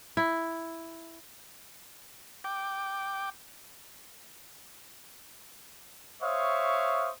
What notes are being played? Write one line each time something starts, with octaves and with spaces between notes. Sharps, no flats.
E4
G5 D6
C5 C#5 E5 F5 C#6 D#6